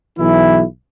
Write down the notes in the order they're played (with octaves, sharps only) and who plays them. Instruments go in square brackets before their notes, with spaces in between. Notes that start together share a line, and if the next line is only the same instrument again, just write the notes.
[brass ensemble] B1 E3 E4